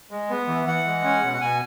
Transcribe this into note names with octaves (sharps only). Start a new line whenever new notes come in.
G#3
B3
E3
E3 F#5
G#3
C#4
B2
F#5
B2 G#5